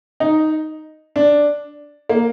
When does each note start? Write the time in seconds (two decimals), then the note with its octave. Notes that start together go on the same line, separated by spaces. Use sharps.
0.20 D#4
1.16 D4
2.09 A#3